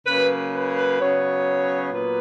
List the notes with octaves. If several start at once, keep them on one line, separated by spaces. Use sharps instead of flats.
C#3 F#3 A#3 B4
B4
B4
C#3 F#3 B3 C#5
A#2 F#3 B3 B4